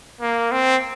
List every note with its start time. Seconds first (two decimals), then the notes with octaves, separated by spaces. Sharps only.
0.21 A#3
0.52 C4